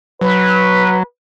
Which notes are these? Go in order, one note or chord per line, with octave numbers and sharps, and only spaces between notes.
F#3 B4